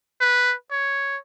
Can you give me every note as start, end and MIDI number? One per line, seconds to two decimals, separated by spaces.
0.21 0.55 71
0.71 1.17 73